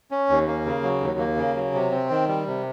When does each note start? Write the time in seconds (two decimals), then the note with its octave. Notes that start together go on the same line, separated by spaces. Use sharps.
0.11 C#4
0.29 D#2
0.48 A#3
0.66 C#3
0.83 F#3
1.01 D#2
1.19 A#3
1.37 C#3
1.55 F#3
1.74 C3
1.91 C4
2.10 D#3
2.28 G3
2.47 C3